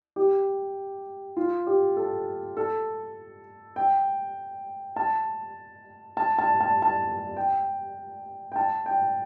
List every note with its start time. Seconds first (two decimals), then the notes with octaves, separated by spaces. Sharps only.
0.16 G4
1.37 F4
1.67 G4
1.96 A4
2.57 A4
3.76 G5
4.96 A5
6.17 A5
6.38 A5
6.60 A5
6.82 A5
7.37 G5
8.52 G5
8.56 A5
8.86 G5